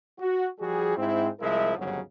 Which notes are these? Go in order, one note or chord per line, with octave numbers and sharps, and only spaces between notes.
F#4
F3 G3 F#4 G#4
G#2 C4 E4
C2 F3 G#3 E4 A#4 E5
G1 D#2 G#2 C#3 F#3